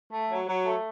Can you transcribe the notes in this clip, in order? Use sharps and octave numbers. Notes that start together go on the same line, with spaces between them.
A3
F#3
F#3
A3